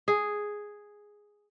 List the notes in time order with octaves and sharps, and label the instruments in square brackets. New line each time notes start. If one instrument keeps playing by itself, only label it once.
[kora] G#4